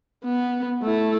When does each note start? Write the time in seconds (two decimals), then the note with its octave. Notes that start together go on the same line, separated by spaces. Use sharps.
0.25 B3
0.83 A3 E4